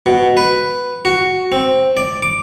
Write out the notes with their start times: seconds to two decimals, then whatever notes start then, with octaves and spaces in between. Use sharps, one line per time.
0.06 B2
0.37 B4
1.05 F#4
1.52 C4
1.97 D5
2.22 D6